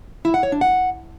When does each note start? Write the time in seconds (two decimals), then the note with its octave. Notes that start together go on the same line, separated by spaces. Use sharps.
0.25 E4
0.34 F#5
0.43 C#5
0.52 D4
0.61 F#5